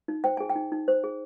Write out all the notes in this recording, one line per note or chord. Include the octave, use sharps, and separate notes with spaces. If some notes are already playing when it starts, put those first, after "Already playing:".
D#4
C5 G5
G#4 G#5
G5
D#4
D#4
C5
G#4